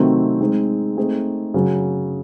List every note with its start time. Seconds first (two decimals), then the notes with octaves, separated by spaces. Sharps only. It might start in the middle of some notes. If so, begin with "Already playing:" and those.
Already playing: C3 D#3 F#3 A3 C4
0.41 G#3 C4 D#4
0.97 A3 C4 D#4 G#4
1.54 F#2 C#3 F#3